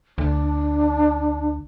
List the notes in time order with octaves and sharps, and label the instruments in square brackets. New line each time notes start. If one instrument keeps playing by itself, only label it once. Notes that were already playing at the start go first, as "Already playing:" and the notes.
[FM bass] D2 [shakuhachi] D4